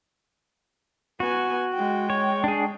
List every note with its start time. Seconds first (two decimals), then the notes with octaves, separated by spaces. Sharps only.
1.20 B3 F#4 G#5
1.74 G#3 G5
2.10 C#5
2.44 D4 G#4